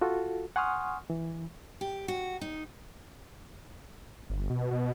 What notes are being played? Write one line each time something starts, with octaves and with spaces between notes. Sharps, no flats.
F4 F#4 A4
F#5 G#5 C6 C#6 D#6 F6
E3
G4
F#4
D#4
G1
B2
B2